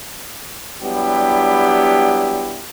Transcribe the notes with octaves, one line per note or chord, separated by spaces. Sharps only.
F#3 G3 B3 D4 E4 G4